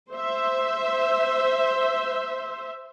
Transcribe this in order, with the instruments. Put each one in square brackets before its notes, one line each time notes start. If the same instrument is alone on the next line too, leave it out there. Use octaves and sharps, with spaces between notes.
[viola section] C5 E5